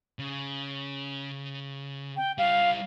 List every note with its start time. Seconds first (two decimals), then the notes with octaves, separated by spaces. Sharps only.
0.19 C#3
2.17 G5
2.38 G3 E4 F5